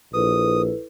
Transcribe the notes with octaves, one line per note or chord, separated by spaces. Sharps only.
A#1 E4 A4 B4 D#6